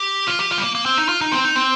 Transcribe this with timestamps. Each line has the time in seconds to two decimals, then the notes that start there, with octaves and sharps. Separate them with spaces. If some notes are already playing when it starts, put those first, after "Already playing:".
Already playing: G4
0.27 F4
0.39 G4
0.51 F4
0.58 G3
0.62 A#3
0.75 A#3
0.86 C4
0.98 D#4
1.09 F4
1.21 D#4
1.32 C4
1.44 D#4
1.56 C4